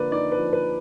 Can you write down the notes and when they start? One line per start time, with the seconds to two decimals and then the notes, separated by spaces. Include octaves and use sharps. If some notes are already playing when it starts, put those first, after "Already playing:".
Already playing: D3 F3 A#3 B4 D5
0.11 D#4 D5
0.32 B4
0.38 F3
0.53 B4